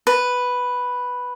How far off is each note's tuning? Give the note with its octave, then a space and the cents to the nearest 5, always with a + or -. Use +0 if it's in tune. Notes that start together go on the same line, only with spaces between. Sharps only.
B4 +0